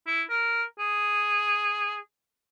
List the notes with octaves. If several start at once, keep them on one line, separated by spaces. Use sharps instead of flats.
E4
A#4
G#4